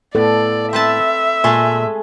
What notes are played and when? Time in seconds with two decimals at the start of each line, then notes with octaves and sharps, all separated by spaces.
0.15 A2 B3 A4 D5
0.73 C4 B4 E5 A5
1.44 A#2 G#3 A3 G#4